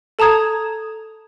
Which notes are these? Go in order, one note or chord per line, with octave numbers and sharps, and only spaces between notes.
A4 A5 A#5 D#6 G#6